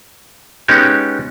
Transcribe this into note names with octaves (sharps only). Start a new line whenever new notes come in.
G#3 B3 C#4 D#4 F#4 G4